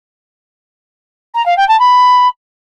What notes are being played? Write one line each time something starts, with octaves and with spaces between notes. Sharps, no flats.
A#5
F5
G5
A5
B5